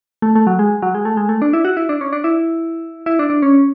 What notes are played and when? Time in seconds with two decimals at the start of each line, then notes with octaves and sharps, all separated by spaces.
0.22 A3
0.35 A3
0.47 F#3
0.59 G#3
0.83 F#3
0.95 G#3
1.05 A3
1.17 G#3
1.29 A3
1.42 D4
1.53 E4
1.65 F#4
1.77 E4
1.89 D4
2.01 C#4
2.13 D4
2.24 E4
3.06 E4
3.19 D4
3.30 D4
3.42 C#4